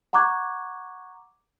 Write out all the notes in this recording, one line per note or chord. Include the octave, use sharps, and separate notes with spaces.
F#5 A#5 C#6 D6 F#6 G#6